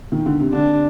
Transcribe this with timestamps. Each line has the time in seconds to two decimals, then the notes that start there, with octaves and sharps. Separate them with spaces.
0.12 D#3
0.26 D3
0.39 C3
0.53 D3 D4